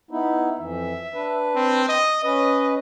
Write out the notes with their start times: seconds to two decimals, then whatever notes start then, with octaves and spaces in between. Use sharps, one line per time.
0.11 B3 D#4 E4
0.59 F2 E3 E5
1.14 D4 B4
1.55 C4
1.89 D#5
2.24 C#4 B4 D#5